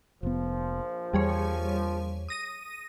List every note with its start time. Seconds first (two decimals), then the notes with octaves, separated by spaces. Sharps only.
0.23 F1 A#1 F3 B3
1.13 E2 G3 G#4 C#5
2.29 D#6 A#6 D#7